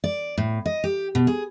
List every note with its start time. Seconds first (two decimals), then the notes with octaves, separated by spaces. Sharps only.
0.04 D5
0.38 A2
0.66 D#5
0.84 G4
1.15 B2
1.27 G#4